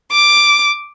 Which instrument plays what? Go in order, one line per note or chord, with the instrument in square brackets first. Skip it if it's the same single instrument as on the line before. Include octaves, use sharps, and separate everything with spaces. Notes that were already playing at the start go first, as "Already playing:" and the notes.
[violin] D6